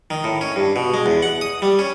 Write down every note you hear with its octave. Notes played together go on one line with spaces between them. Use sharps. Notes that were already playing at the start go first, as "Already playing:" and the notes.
D#3
A2
C#4
G2
B2
G#3
E2
F#5
D#6
G3
C#4